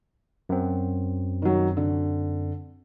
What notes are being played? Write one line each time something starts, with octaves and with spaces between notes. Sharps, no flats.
F#2 C4
D#3 F#3
D3